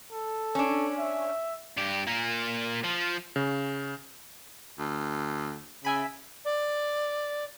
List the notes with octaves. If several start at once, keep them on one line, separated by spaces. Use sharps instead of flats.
A4
C#4 D4
E5
G2 G4
A#2 A#3
F3
C#3
D2
C#3 E5 G#5 B5
D5